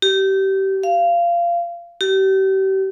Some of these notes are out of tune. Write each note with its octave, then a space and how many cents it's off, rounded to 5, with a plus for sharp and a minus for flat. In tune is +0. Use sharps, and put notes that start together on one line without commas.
G4 -25
F5 -20
G4 -35